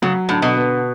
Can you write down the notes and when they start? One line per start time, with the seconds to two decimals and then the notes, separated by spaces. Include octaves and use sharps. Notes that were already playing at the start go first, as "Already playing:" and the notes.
0.02 C#3 F#3
0.29 A2 D3
0.42 B2
0.56 B3